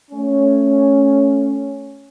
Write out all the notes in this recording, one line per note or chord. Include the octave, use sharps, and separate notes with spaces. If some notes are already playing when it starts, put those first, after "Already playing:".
A3 C#4